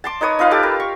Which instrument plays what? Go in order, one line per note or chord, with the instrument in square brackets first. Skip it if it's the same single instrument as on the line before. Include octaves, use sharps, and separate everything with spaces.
[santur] A5 C6 D6
D#4 B4 C#5 D#6
D#4 F4 B4 F5
G4 A4 A5 D6
A#4
C#6